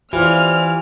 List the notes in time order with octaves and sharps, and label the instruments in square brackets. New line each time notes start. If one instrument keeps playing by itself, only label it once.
[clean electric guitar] E3 [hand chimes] E4 C5 D5 [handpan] F4 G4 [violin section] F6